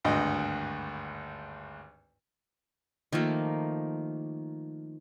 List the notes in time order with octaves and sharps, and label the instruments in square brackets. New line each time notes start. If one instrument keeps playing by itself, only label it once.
[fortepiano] G#1 D2 G2 D#5
[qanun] D#3 F3 A3 A#3